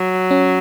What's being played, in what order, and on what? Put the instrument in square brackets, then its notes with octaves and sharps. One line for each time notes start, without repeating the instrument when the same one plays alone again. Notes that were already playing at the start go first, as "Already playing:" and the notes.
Already playing: [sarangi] F#3
[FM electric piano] C#4